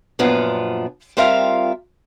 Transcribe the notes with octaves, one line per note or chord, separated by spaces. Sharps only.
F#2 A#2 F3 B3 D4
G3 C4 F4 A#4 E5 F5